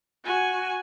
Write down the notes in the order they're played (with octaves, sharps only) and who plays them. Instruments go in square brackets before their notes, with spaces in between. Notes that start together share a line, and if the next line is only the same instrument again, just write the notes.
[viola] F#4 G#5